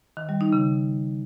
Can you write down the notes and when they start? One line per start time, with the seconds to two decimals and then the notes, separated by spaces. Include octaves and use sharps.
0.17 D#3
0.29 G3
0.41 D#4
0.53 C#3